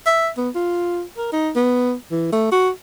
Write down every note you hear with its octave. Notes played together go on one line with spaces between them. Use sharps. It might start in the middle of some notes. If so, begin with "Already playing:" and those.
E5
B3
F4
A#4
D#4
B3
E3
A3
F#4